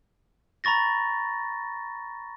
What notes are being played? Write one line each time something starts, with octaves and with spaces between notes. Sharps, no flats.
A#5 B5 C#6 A6 A#6